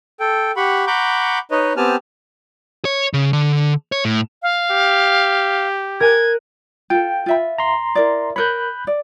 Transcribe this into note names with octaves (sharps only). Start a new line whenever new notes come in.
A4 G5
G4 F#5 B5 C#6
F#5 A#5 B5 C#6 D6 G6
D#4 B4 C#5 D#5
B3 C4 G4 G#5 A5 F6
C#5
C#3
D3
C#5
A2
F5
G4
A#4 G#5 F#6 G#6
F4 A4 G5
F4 E5 B5
A#5 C6
E4 A#4 D5
A#4 C#5 B5 F#6 G6
D5